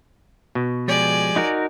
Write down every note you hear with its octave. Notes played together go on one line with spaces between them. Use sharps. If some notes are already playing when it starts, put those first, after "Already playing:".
B2
F3 G#3 G4 D5 G#5
D#4 F#4 A#4